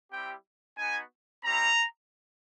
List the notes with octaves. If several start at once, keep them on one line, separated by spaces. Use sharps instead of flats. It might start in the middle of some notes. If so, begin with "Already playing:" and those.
G3 C4 E4 G4 G5
B3 D#4 F#4 G#5
G3 C4 E4 A#5